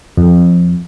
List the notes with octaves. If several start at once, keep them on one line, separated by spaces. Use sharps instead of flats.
F2